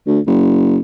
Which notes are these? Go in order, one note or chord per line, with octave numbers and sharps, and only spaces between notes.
D2
F#1